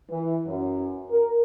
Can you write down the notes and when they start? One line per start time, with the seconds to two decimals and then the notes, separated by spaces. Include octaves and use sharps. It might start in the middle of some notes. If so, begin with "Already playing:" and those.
0.10 E3
0.47 F#2
1.10 A#4